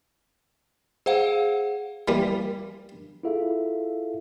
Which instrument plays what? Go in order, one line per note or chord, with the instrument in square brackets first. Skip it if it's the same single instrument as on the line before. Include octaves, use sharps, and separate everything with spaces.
[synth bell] G#4 C5 F5 F#5
[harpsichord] E3 G3 A#3
[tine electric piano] E4 F4 G#4 A4 E5 F5